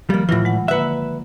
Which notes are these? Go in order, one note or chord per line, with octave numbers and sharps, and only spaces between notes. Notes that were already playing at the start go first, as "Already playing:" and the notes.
D#3 F3 G3 A#3
A2 E3 F#3 F4
G#3 F#5
D3 A#3 B4 E5